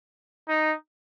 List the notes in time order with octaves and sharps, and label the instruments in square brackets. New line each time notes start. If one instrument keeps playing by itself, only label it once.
[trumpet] D#4